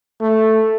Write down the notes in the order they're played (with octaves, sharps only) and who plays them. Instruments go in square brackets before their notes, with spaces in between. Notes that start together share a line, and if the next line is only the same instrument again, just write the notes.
[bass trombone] A3